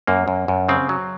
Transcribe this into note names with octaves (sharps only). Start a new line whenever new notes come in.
F#2 A#3
F#2
F#2
C#3 C4
F#3